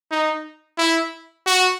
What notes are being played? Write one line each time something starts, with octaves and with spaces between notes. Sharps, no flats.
D#4
E4
F#4